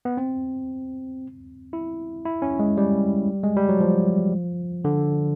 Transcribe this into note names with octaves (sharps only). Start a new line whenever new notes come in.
B3
C4
E4
E4
C#4
G#3
G3
G#3
G3
F#3
F3
D3